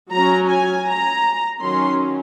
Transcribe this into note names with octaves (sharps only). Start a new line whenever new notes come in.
F#3 C#4 A#5
G#5
A#5
D#3 F#3 C#4 C6